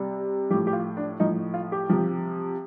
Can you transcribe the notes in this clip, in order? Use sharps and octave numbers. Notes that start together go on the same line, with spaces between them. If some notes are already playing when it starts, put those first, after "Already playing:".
Already playing: C3 G3
A2 F3 G4
G4
F4
D4
A2 F3 D#4
F4
G4
C3 F3